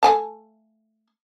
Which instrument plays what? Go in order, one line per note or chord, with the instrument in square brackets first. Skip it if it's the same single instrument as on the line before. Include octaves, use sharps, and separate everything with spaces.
[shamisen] A3 G#5 A5